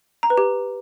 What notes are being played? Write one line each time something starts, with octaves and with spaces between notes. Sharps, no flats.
A#5
B4
G4